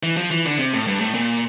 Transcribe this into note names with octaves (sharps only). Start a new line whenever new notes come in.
E3
F3
E3
D3
C3
A2
G2
A2
A#2